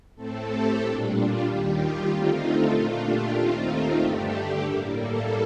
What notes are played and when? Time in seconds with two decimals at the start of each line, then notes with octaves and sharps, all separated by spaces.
0.15 A2 A3 C4 A4
0.47 G4
0.79 A#2 G3 D4
1.11 F4
1.43 D#2 D#3 G3 G4
1.75 F4
2.07 D3 A3 C4 D#4 F4
2.71 A#2 A3 D4 F4
3.02 G4
3.35 D#2 D#3 A3 C4 D#4 F4
3.99 G2 D3 A3 D4 G4
4.63 A2 G3 A#3
4.95 A4